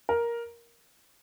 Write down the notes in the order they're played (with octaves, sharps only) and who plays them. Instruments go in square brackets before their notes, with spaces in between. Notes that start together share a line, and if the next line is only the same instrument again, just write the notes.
[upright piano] A#4